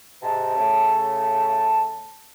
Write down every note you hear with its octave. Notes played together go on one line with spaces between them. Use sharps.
G#2 C3 A5
C#3 A3